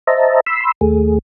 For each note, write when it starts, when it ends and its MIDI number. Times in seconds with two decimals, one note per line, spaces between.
0.07 0.40 72
0.07 0.40 75
0.07 0.40 76
0.07 0.40 81
0.07 0.40 82
0.47 0.72 83
0.47 0.72 84
0.47 0.72 88
0.81 1.18 39
0.81 1.18 57
0.81 1.18 68